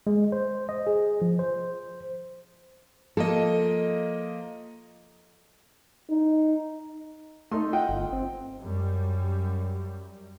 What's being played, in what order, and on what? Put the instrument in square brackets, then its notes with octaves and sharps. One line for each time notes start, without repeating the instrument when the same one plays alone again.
[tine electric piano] G#3
C5
D#5
G#4
F3
C5
[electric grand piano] F3 A#3 D#5 [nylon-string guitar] A4
[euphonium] D#4
[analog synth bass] A3 [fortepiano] D#4 A4 C6
[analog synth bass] F4 [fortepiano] D#5 F#5 G5
[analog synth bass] G1
C4
[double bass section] F#2 G3